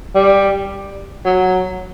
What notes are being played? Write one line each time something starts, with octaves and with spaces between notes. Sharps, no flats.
G3
F#3